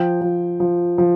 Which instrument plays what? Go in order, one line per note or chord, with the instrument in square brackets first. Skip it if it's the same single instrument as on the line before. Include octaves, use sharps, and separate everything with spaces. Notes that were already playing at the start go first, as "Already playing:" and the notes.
Already playing: [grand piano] F3 G5
F3
F3
F3